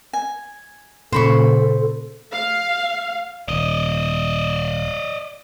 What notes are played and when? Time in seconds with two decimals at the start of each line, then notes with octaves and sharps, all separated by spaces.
0.13 G#5
1.12 A#2 C#3 A4 C5 B5 C#6
2.32 F5
3.48 D#1 D5 D#5